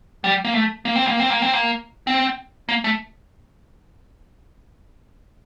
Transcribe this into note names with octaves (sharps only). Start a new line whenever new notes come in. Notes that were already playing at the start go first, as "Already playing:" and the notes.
G3
A#3
A3
A#3
C4
A#3
C4
A#3
C4
A#3
C4
A#3
A3